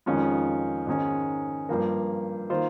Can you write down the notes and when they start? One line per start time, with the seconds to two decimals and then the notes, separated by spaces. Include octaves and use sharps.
0.06 F2 D#3 G#3 C#4 F4
0.87 G#2 D#3 G#3 C#4
1.69 G2 F3 A#3
2.49 D#3 A#3 F4 C5